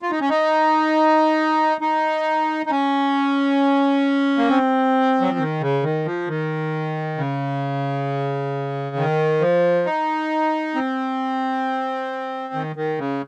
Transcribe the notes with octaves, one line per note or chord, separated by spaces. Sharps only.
F4
D#4
C#4
D#4
D#4
D#4
C#4
A#3
C4
F#3
F3
D#3
C#3
D#3
F3
D#3
C#3
D#3
F3
D#4
C4
D#3
D#3
C#3